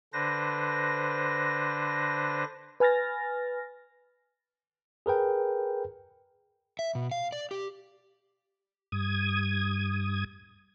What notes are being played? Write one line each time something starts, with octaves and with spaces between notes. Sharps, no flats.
D3 D4 B4 C5 A#6
B4 G#5 F6 A6 A#6
G#4 A#4 B4 G5
E5
B2
F5
D5
G4
G2 D#6 G#6